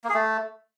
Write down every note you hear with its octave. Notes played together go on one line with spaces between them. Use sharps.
A#3
G#4
A3